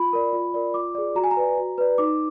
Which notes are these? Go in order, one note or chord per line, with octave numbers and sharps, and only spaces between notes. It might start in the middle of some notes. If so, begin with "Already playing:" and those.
Already playing: F4 B5
A#4 D5
F4
A#4 D5
F4 D6
G#4 D5
F#4 A#5
G#5
A#5
B4 D5
F#4
B4 D5
D#4 D6